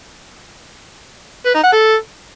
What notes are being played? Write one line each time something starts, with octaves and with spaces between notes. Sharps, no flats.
B4
D#4
F#5
A4